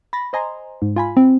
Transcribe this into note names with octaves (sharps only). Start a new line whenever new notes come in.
B5 A6 A#6
C5 D#5 G#5 A#5 C6
G#2
F4 G#5 B5
C4